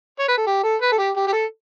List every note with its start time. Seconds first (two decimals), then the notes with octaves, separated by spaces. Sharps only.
0.19 C#5
0.28 B4
0.37 A4
0.46 G4
0.63 A4
0.81 B4
0.92 A4
0.98 G4
1.16 G4
1.27 G4
1.32 A4